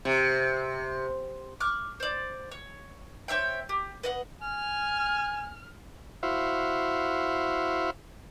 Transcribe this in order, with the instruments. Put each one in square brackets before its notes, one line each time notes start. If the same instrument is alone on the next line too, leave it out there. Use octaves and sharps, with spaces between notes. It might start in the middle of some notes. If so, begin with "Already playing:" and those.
[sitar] C3
[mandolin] C#6 D6 F6 F#6
C5 D5
C#5
C5 C#5 E5 G5
G4
B4 D#5 F#5
[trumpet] G#5 [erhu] F6
[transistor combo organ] E4 F#4 C5 E5 F5